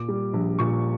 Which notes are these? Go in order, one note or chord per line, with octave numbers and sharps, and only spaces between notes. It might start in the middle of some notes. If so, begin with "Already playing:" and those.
Already playing: A#2 D6
G3
A#1
A#2 C#6